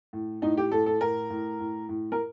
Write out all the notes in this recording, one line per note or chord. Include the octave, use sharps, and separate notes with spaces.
A2
A2 D#4
G4
A2 A4
A4
A2 A#4
A2
A2
A2
A#4